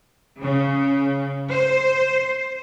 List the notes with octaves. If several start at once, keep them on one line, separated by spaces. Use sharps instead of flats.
C#3
C5